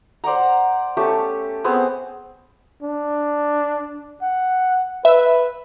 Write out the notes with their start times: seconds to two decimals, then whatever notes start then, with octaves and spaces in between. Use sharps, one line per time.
0.24 C5 D5 F#5 A#5
0.97 A3 C#4 G4 A5
1.64 B3 C4 G#4 C5
2.83 D4
4.22 F#5
5.05 B4 E5